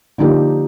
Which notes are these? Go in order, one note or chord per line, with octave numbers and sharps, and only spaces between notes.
D3 F3 A#3 D#4 G4